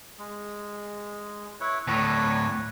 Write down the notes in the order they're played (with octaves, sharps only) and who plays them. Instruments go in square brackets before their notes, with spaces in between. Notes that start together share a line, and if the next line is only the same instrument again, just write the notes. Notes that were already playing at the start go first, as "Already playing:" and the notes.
[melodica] G#3
E4 B4 C#5
[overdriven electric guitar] D2 A2 [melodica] B4 C#5 D5